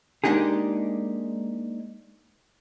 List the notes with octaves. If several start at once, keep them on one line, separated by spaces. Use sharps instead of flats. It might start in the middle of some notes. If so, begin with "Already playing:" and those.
G#3 A#3 D4 D#4 G4 G#4